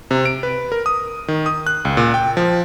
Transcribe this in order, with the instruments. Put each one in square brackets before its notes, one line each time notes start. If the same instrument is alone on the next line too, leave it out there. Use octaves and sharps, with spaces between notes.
[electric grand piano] C3
D7
B4
A#4
D#6
D#3
D#6
F#6
C#2
A#2
G5
F3